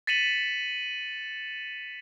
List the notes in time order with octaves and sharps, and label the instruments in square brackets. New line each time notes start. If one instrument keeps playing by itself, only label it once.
[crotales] A6 B6 C#7 D#7 E7 F#7